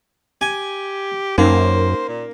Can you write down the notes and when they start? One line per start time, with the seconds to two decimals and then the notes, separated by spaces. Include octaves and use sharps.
0.41 G4 G#5
1.38 F#2 A#3 C#4 D#4 C5
2.09 A#2